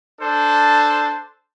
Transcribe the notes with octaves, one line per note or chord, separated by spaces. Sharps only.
D4 A4 C5 A5